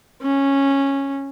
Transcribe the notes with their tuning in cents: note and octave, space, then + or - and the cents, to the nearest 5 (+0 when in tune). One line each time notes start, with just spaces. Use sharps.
C#4 -10